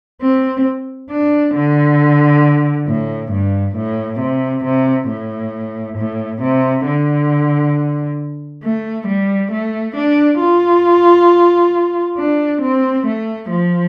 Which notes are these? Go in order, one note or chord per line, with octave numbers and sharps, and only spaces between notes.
C4
D4
D3
A2
G2
A2
C3
C3
A2
A2
C3
D3
A3
G3
A3
D4
F4
D4
C4
A3
F3